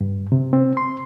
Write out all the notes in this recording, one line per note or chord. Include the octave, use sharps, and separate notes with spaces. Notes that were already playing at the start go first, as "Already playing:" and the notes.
G2
C3
C4
C6